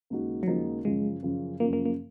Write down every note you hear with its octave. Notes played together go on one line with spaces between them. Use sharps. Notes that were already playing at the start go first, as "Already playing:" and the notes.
D#2 C#3 G#3 D#4 F#4
F#3
D#2 C#3 F3 G#3 D#4 F#4
F#2 C#3 F3 G#3
F#2 C#3 F3
F#2 C#3 F3 A#3
A#3
A#3